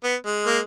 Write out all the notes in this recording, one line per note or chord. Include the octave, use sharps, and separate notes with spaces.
B3
G#3
A#3